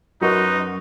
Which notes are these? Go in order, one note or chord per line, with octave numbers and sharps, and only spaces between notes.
F#2 F#3 D#4 A#4 B4 D#5 C6 C#6